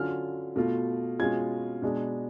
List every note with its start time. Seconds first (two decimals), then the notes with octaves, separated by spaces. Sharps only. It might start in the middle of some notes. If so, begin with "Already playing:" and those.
Already playing: D3 F#3 C#4 F4 F6
0.56 B2 A3 F4
1.19 B2 G#3 C#4 F4 G#6
1.82 B2 G#3 D4